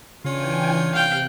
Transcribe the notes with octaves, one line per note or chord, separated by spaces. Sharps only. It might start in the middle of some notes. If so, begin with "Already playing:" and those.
C#3 E3 C#4 D4 F4 G5 G#5
C3 F5 G5 F#6